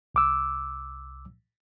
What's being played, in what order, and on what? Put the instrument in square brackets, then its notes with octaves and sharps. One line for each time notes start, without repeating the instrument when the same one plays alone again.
[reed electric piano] C2 D6 E6